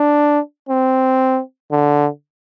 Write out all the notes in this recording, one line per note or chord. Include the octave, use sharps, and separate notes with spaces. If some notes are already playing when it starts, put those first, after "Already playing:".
Already playing: D4
C4
D3